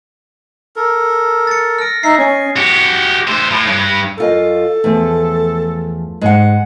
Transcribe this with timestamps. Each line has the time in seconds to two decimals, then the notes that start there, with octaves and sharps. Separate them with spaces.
0.76 A4 A#4
1.47 A6 C#7
1.79 F6 A#6 D7
2.03 D#4 E5 C7
2.19 C#4 D#5 G#5
2.56 F#4 G4
3.27 A3 C5
3.51 A2
3.67 G2
4.18 F#2 F4 A4 D#5
4.84 E2 F3 A3
6.21 G#2 G#3 F#5